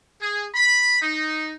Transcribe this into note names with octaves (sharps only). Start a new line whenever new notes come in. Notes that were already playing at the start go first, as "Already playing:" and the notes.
G#4
B5
D#4